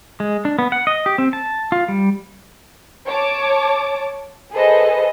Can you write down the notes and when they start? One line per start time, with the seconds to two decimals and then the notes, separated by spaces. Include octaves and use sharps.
0.20 G#3
0.45 D4
0.59 B3
0.72 F#5
0.87 D#5
1.06 G4
1.18 C4
1.33 A5
1.72 F4
1.88 G3
3.07 C#5 A5 D6
4.52 G#4 A4 B4 C5 D#5